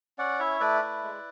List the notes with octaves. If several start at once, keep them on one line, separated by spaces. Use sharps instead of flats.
C#4 D5 F#5
E4 C#5 E5
A3 B4 D5
E4
G#3